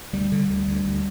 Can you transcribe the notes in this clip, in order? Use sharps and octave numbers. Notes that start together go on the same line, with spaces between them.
D2 G3
D3
D2
D2
D2